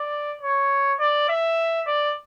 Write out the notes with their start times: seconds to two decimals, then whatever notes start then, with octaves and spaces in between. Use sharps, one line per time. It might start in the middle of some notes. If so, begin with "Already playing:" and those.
Already playing: D5
0.42 C#5
1.00 D5
1.29 E5
1.87 D5